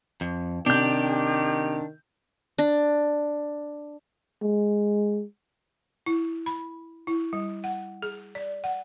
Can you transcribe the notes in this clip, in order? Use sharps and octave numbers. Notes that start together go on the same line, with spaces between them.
F2
C3 D#3 D4 G4 G6
D4
G#3
E4
B5
E4
G3
F#5
G#4
D5
F#5